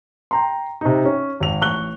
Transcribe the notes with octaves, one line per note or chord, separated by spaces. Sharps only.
G5 A#5 C6
C3 D#4
C#4
G#1 F7
A1 C#6 F#6 G7